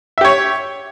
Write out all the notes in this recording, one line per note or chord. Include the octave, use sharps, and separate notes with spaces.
G4 C#5 E5